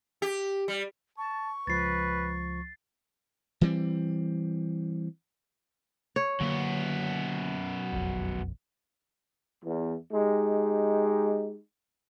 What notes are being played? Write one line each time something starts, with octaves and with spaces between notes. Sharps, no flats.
G4
G3
A5 C#6
C#2 F3 B4 A6 C7
E3 G3 C4
C#5
F#2 D3 A#3 B3
F#1 B1 F2
E2
G#3 D#4 G4